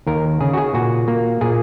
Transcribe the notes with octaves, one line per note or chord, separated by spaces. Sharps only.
D#2 A#4
C#3 G#4
F#4
G#4
A#2 F#4
A#3
A#2 G#4